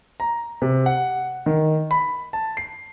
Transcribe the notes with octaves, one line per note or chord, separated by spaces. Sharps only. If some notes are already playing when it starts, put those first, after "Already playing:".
A#5
C3
F#5
D#3
B5
A5
C7